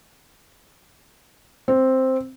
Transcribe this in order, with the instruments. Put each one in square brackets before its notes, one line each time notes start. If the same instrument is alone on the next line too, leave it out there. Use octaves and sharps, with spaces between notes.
[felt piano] C4